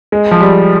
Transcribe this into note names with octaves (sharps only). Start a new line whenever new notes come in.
G#3
F3
G3